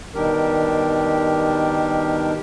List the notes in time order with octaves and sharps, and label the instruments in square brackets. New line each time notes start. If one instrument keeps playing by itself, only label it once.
[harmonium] B2 D#3 G3 D4 G4 A#4